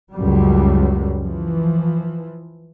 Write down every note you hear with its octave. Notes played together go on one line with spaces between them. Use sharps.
C#2 F#2 F#3 G3
E3 F3